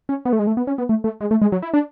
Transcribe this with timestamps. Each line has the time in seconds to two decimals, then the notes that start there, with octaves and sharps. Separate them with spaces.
0.09 C#4
0.25 B3
0.33 A3
0.39 G#3
0.47 A3
0.57 B3
0.67 C#4
0.78 B3
0.89 A3
1.04 A3
1.21 G#3
1.31 A3
1.42 G#3
1.52 F#3
1.62 E4
1.74 D4